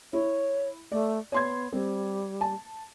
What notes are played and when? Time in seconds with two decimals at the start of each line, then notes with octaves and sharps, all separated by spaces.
0.13 E4 C#5
0.92 A3 D5
1.32 B3 C#5 C6 G#6
1.73 G3 C4
2.41 A5